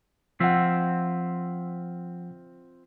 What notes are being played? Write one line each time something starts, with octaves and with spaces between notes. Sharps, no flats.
F3 C4 F4 E5 F#5